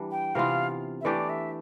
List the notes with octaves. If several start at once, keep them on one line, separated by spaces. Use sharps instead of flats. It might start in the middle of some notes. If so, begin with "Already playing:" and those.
Already playing: E3 G3 D4
G5
C3 E3 B3 F4 F5
E5
E3 A3 D4 G4 D5
E5